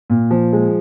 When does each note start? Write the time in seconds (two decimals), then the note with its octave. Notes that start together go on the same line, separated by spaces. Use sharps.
0.10 A#2
0.31 F3
0.53 G#3